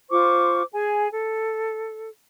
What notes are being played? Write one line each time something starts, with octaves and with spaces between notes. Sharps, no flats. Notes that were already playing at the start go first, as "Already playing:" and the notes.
F4 C5 C#6 D6
G#4 G#5
A4